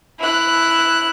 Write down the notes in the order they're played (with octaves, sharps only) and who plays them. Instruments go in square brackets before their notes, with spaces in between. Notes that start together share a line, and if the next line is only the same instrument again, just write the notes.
[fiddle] E4 F#6